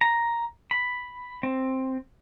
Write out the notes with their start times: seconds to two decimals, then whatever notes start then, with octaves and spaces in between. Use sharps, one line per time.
0.01 A#5
0.71 B5
1.43 C4